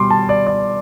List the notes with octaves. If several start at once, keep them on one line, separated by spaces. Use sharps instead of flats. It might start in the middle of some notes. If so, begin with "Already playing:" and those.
Already playing: B2 G3 C6 D6
A5
D5
D5